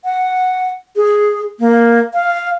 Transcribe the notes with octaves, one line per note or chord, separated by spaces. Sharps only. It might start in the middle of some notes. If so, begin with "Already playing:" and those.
F#5
G#4
A#3
F5